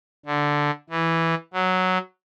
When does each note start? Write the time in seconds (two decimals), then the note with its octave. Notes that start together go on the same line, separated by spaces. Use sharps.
0.26 D3
0.90 E3
1.53 F#3